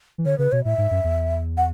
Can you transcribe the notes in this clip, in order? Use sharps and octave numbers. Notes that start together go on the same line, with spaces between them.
E3
D3 C#5
C#3 B4
B2 C#5
A2 E5
G#2
F#2
E2
F#5